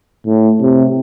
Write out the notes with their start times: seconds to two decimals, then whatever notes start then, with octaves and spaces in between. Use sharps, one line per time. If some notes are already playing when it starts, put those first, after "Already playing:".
0.27 A2
0.61 C3